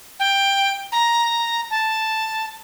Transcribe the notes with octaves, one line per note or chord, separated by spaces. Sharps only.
G5
A#5
A5